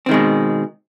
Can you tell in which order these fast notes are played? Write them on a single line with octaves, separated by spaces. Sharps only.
C4 D#3 G#3 B2